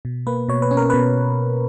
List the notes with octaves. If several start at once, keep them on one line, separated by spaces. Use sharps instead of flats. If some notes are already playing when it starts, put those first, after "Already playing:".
B2
A#3 B4
B2 C#5
B4
C#4
A#4
B2 B4